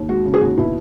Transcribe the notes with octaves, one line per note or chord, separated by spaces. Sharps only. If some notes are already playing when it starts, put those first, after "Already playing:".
Already playing: D#2
G#3 F#4
C#3
G#4
D#2 F#4
B2 E4